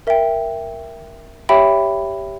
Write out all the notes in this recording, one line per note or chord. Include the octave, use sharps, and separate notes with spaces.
A#4 E5 G5
G4 C#5 E5 G5 B5